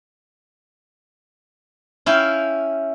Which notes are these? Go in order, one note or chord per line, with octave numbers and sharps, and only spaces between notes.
C#4 E4 F5 G5